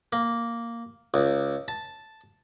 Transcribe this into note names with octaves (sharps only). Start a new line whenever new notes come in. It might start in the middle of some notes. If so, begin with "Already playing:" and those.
A#3
C#2
A5